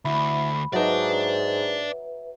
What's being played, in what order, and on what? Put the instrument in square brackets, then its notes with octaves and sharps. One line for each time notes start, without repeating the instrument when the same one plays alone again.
[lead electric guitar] D2 [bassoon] E4 [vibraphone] B5
[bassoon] G#2 [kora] F#3 D#4 [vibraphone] B4 E5 [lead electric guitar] D5 A5